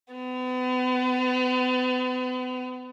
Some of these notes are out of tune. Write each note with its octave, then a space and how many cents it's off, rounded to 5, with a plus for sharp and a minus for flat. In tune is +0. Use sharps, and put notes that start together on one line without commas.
B3 +40